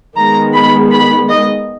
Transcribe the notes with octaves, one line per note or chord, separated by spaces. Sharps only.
D#3 G#3 B3 A#5
B5
B5
D#5